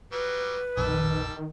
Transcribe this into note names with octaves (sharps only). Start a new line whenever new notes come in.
F#3 G3 B4
A#1 F2 B2 D#3 G3 A5 E6